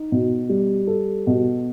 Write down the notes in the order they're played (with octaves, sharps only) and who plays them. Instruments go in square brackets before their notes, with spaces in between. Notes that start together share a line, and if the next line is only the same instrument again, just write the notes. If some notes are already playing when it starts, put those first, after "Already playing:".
Already playing: [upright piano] D#4
B2
G3
A4
B2